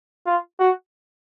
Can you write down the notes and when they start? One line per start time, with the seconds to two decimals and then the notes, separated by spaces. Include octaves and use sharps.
0.26 F4
0.59 F#4